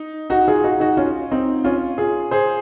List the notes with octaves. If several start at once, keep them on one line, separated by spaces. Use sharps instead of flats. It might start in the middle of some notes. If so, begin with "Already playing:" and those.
Already playing: D#4
D#4 F#4
F4 G#4
D#4 F#4
D#4 F#4
C#4 F4
C4 D#4
C#4 F4
F4 G#4
G#4 C5